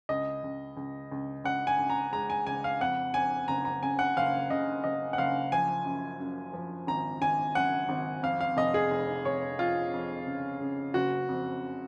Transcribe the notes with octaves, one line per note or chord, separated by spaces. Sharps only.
C#2 D#5
C#2
C#2
C#2
C#2 F#5
G#5
C#2
A#5
G#3 A#5
G#5
C#2 G#5
F5
F2 F#5
F2 G#5
F#1 A#5
A#5
C#3 G#5
F#5
F#1 F5
C#3 D#5
F#1 D#5
F#5
F#1 F5
F3 G#5
F#2
F#2
F3
G#1 A#5
G#1 G#5
F#2 F#5
G#1
F2 F5
F5
F1 D#5
G#4
F1
F1 C#5
F2 F4
F2
C#3
C#3
F#1 F#4
F2